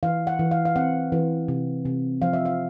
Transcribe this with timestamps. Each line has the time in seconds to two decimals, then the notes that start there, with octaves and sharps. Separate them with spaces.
0.03 E3 F5
0.27 F#5
0.39 E3
0.51 F5
0.65 F5
0.76 C4 F#5
1.12 E3
1.48 C3
1.85 C3
2.22 F3 F5
2.33 E5
2.45 F5